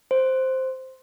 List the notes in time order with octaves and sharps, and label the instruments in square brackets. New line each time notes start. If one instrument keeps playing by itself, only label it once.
[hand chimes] C5